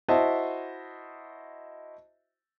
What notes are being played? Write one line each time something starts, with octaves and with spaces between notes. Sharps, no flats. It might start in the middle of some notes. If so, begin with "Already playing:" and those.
E4 F#4 C5 D#5 E5 A5